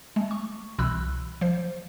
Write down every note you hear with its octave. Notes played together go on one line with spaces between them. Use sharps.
G#3 A3
C#6
C2 B2 E3 B5 E6 F#6
F3 C5